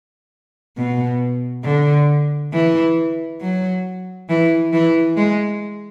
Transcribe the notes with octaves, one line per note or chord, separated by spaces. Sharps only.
B2
D3
E3
F#3
E3
E3
G#3